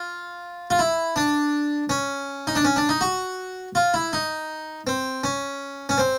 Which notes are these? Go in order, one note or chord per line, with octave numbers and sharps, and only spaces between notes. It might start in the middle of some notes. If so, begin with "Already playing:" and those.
Already playing: F4
F4
E4
D4
C#4
D#4
D4
C#4
D4
D#4
F#4
F4
E4
D#4
C4
C#4
C#4
C4